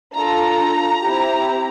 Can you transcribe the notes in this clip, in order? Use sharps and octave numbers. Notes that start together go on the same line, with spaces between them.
D4 F4 A4 A#5
C4 E4 G4